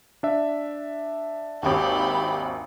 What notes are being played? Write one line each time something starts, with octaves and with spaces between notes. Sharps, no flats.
D4 E5
G#1 D#2 G4 B5